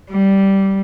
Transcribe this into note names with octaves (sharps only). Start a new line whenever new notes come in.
G3